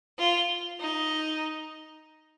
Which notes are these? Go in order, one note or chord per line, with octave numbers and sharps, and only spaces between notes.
F4
D#4